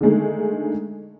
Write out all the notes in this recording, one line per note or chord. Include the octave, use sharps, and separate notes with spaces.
D3 D#3 G#3 A3